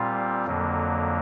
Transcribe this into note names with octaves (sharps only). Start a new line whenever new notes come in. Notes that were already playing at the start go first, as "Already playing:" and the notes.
Already playing: A#2 G3 C4 F4
F2 D3 F#3 A#3